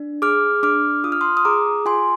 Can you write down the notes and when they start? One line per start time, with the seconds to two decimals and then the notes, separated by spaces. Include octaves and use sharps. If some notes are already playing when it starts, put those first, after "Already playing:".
Already playing: D4
0.22 G#4 D6 F6
0.63 D4 D6 F6
1.04 F4 D#6
1.12 F6
1.21 C6 D#6
1.37 D#6
1.45 G#4 A#5 D6
1.86 F4 G#5 C6